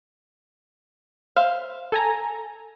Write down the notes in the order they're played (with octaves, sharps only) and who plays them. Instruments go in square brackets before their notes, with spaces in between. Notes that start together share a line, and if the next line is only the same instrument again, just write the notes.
[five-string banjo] C5 E5 F5
[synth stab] A4 G#5 A#5